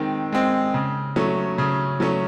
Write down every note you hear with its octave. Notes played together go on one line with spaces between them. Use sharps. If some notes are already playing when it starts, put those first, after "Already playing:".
Already playing: D#3 G#3 C4
G#3 C4
C#3
F#3 A3 C#4
C#3
F#3 A3 C#4